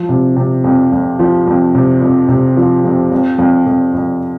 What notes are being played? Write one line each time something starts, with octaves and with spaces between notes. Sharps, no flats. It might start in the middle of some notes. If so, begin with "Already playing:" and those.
Already playing: F3
C3
C3
F2
F2
F3
F2
C3
F2
C3
F3
F2
F2
F2
F2
F2